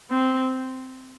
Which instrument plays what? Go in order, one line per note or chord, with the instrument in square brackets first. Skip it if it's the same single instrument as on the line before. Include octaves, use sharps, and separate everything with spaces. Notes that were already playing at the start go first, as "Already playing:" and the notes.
[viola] C4